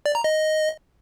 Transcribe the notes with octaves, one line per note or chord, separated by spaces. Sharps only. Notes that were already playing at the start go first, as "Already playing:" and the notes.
D5
A#5
D#5